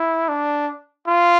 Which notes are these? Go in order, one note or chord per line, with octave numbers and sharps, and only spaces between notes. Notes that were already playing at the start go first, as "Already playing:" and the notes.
Already playing: E4
D4
F4